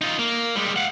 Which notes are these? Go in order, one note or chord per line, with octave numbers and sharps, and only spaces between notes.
D#4 F4
A#3
G3 G#3
F5 F#5